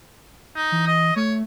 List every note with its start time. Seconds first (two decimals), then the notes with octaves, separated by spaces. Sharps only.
0.56 D#4
0.72 E3
0.87 D#5
1.16 A3 C#5